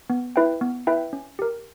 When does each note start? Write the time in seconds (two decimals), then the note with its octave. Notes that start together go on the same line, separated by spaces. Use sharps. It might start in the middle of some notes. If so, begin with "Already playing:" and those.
0.10 B3
0.36 E4 B4 E5 G5
0.61 B3
0.87 E4 B4 E5 G5
1.13 C#4
1.39 G4 A#4